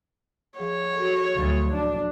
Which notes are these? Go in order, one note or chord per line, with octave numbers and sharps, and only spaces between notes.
F3 G#4 C#5
F#4 A4
D2 F3 F#3 A6
D4